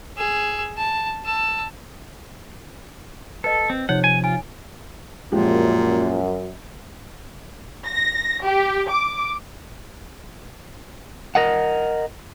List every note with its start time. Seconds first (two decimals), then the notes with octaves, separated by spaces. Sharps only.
0.17 G#4 E6
0.77 A5
1.25 A5 E6
3.44 A4 B4 D#5
3.70 C4
3.89 C3 F3 D#4 C#5 F#5
4.04 G#5
4.24 F4 G#5
5.32 F#2 A#2 F3 G#3 G4
7.86 A#6
8.45 G4
8.90 D6
11.35 A#4 D#5 F#5